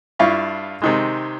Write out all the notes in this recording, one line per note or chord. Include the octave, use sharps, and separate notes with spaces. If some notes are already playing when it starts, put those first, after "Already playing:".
G2 D4 E4 F4 F5 C#6
C3 D#3 G#3